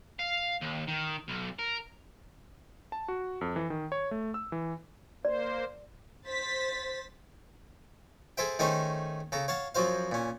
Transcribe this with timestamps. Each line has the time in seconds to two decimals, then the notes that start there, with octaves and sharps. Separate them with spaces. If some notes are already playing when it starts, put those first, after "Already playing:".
0.19 F5
0.62 D#2
0.88 D#3
1.28 B1
1.59 A#4
2.92 A5
3.08 F#4
3.41 F2
3.56 E3
3.70 D#3
3.92 C#5
4.11 A3
4.34 E6
4.52 E3
5.25 A#3 C5 D5
6.26 C5 A6 B6
8.38 G#4 A4 C5 E5 G5
8.59 D#3 A3 C#4 D#4 G#4 C5
9.32 C#3 A4 A#5
9.48 C#5 F5 F#5 A5
9.75 F#2 F3 F#3 F#4 C5 F5
10.12 A#2 C#4